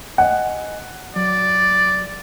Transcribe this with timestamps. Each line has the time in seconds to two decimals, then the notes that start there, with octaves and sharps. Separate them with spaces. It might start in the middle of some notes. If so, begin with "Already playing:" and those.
0.18 D#5 F#5 G#5
1.16 F#3 D5